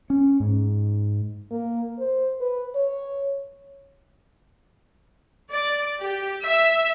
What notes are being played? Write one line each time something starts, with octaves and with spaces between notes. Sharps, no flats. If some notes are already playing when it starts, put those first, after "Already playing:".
C#4
G#2
A#3
C5
B4
C#5
D5
G4
E5